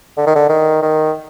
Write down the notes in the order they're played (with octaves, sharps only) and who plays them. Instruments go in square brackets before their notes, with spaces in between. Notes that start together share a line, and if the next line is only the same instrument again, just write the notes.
[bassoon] D3
D#3
D3
D#3
D#3